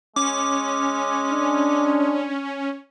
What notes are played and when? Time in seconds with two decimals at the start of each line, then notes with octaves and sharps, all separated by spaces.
0.16 G#3 C#4 D6
1.32 D4